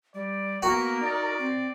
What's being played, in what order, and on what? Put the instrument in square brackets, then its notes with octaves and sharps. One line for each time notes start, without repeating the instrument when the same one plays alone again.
[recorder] G3 [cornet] D5
[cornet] A#3 [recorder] B3 [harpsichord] F#4 [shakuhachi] A#4
[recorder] D#4 [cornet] D5
[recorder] C4